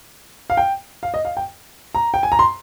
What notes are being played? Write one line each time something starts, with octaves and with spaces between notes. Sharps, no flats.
F5
G5
F5
D#5
F5
G5
A#5
G5
G#5
A#5
C6